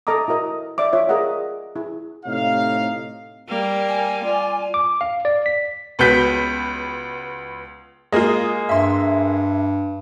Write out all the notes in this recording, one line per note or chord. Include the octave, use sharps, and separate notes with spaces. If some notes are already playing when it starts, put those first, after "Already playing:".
A4 D#5 A#5 D6 D#6
E4 F#4 A#4 D#5
D5 E5 D6
F4 C#5 E5
G#4 A#4 D5 D#5 F#5
E4 G#4
A2 C3 D#4 C#5 F5
G3 A#3
G#5
F4 D5
D6
F5
D5
B6
C#2 B3 F#4 G6 B6
G#3 A#3 F4 D#5
G2 E5 C6